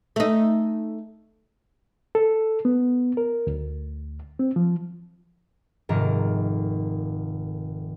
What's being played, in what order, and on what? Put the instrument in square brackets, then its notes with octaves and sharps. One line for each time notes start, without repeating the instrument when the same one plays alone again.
[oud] A3 D#4
[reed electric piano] A4
B3
A#4
D2
C4
F3
[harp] F1 G#2 D#3 A4 A#4